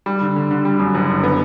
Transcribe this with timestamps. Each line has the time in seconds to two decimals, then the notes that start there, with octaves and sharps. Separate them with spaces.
0.06 G3
0.21 D3
0.36 D3
0.51 D3
0.65 G3
0.79 F#2
0.95 F#1
1.10 D3
1.23 B3